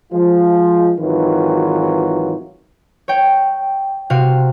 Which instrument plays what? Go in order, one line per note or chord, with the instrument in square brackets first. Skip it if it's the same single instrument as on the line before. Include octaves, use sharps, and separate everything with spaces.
[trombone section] F3 G#3 F4
G#1 D#3 E3 F#3 F4 B4
[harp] C#5 G5
C3 F#4 F5